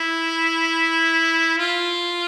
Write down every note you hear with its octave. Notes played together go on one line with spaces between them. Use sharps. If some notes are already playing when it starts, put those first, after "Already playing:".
Already playing: E4
F4